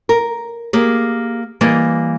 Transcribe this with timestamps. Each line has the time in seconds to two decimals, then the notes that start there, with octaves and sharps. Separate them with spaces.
0.09 A#4
0.73 A#3 G4 G#4
1.61 E3 G3 A#3 D5 D#5